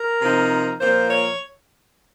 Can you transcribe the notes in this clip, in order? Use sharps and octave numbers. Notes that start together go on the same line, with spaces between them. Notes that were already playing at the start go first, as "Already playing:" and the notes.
Already playing: A#4
C3 F3 C4 D#4
A#2 F3 A#3 C5
C#5